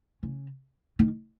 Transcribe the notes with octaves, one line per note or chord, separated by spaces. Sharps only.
C#3
D#3